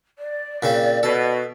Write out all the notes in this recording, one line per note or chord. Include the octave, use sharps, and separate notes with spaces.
D5
A#2 C#3 C4
B2 A4